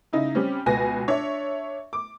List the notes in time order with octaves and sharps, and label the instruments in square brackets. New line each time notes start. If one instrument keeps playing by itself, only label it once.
[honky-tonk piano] C#3 D#4 E4
G3 C4 C#4
C#2 B2 B4 G#5 A#6
D4 C#5 E5
D6